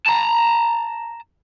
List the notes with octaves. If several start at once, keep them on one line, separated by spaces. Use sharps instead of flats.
A5 A#5